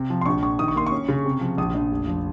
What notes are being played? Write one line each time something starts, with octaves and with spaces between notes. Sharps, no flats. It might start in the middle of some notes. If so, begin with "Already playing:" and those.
Already playing: C3
F3
C6
A#1 C#6
A#1 C#6
D#3 D#6
C#6
A#3 C6
C#6
C#4
C#3
C3
F3
A#1 D#6
A#1
F1
F3